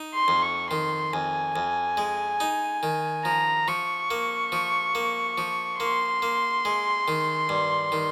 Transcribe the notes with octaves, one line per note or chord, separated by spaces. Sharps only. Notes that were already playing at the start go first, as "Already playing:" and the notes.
Already playing: D#4
C6
F2
C#6
D#3 C6
F2 G#5
F2
G#3
D#4
D#3
F3 A#5
F3 C#6
A#3
F3
A#3
F3
A#3 C6
A#3
G#3
D#3
G2
D#3